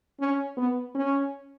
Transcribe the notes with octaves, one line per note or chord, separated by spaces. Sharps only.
C#4
B3
C#4